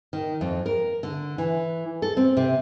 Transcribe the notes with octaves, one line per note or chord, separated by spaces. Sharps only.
D#3
F2
A#4
D3
E3
A4
C4
C3